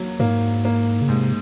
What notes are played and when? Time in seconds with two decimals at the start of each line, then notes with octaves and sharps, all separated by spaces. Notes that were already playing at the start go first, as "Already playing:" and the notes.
Already playing: F#3 A#3
0.20 G#2 A#3
0.65 A#3
1.02 C#3
1.09 G#2 C3